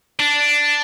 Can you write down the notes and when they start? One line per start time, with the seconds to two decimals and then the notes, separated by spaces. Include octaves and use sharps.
0.20 D4